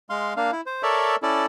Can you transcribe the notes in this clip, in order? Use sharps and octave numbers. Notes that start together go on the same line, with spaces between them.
G#3 F5 C6
A#3 D4 F5
E4
C5
A4 A#4 C#5 D5 E5
C#4 E4 A4 D5